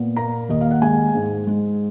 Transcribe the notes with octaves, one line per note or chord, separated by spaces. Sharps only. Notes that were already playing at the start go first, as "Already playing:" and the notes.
Already playing: A#2 B3
A#3 A#5
D#2 D#5
F5
F#5
G#3 G#5
G#2
G#3